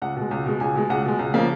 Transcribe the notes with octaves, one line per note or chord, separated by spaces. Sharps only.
C#2 F#5
B2 G#3
C#2
B2 G#3
C#2 G#5
B2 G#3
C#2 F#5
B2 G#3
C#2
C#3 F3 A#3